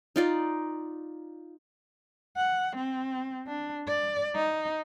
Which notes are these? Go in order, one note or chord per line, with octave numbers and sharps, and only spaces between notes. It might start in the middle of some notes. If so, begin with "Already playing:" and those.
D#4 F4 D5
F#5
C4
D4
D5
D#4